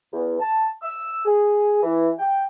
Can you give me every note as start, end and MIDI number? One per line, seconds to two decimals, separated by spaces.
0.13 0.39 40
0.40 0.68 81
0.82 1.23 88
1.26 1.82 68
1.83 2.10 52
2.19 2.44 79